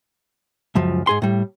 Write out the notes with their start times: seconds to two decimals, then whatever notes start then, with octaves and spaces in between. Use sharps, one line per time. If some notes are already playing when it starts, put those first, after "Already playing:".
0.75 C#2 F#2 F3
1.07 G#2 G#4 C6
1.22 A2 G3